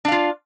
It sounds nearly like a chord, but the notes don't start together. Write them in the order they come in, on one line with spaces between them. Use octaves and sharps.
D4 F5 F4